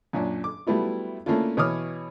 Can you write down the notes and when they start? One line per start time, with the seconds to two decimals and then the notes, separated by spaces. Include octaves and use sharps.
0.13 F#2 A#2 C#4 D4
0.44 D6
0.67 F#3 G3 A3 B3 E4 F4
1.26 A3 A#3 C#4 D4 E4 F4
1.57 B2 E3 C#5 D6 D#6 F6